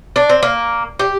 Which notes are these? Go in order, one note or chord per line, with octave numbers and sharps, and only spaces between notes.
D4
C4
A#3
G4